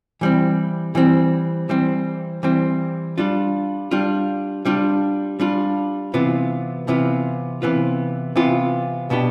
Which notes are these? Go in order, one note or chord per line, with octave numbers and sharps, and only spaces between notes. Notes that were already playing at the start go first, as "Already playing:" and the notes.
E3 G3 C4
E3 G3 C4
E3 G3 C4
E3 G3 C4
G3 D4 F4
G3 D4 F4
G3 D4 F4
G3 D4 F4
C3 E3 B3 F4
C3 E3 B3 F4
C3 E3 B3 F4
C3 E3 B3 F4
B2 B3 D4 G4